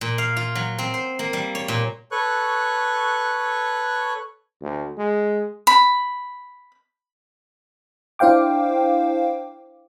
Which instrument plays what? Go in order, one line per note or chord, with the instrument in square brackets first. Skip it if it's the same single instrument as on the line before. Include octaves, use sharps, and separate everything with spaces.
[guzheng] A#2
F5
F4
F#3
C4
C5
A#3
G3
C#5
A#2
[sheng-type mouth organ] A4 B4 C#5 C#6 F#6
[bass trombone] D2
G#3
[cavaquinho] B5
[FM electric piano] D4 E4 C5 F5 G5 D6